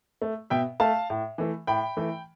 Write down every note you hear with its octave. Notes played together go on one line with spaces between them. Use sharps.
A3
B2 E5 G5
A3 F5 A5
A2
E3 A3
A2 G5 B5
E3 A3